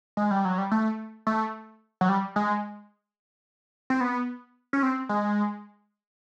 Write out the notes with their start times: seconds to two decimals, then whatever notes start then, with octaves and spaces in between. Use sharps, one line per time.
0.17 G#3
0.31 G3
0.45 F#3
0.58 G3
0.72 A3
1.27 A3
2.01 F#3
2.09 G3
2.36 G#3
3.90 C4
4.01 B3
4.73 C#4
4.83 C4
5.09 G#3